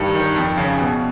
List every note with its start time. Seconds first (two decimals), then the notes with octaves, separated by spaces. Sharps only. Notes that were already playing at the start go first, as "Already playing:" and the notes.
Already playing: G2 D#3
0.15 D#3
0.36 F2
0.57 C#3
0.79 B2